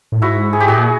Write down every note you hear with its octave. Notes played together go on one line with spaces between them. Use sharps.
A2
G#2 E4 F#4
G#4
G4
A2 F#4 G#4
A#2